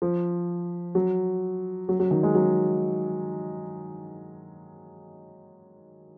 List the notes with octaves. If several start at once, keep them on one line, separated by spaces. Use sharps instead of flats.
F3
F#3
F#3
F#3
D#3
G#3
F#3